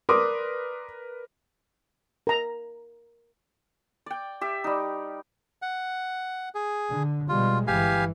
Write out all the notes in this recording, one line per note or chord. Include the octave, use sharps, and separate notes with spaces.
A#4 B4 D5 C6 D6 D#6
A#4 A#5
D5 G5
G4 E5
G3 D#4
F#5
G#4
D3
B2 G3 G#3 F4
G1 E3 G4 F5 G#5